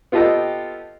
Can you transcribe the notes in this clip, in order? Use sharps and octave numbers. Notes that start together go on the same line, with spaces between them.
B3 F4 G4 A4 D#5 G5